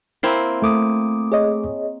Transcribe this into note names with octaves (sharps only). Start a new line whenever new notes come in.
A#3 C4 E4
A3 D6 D#6
G#4 C#5 D#5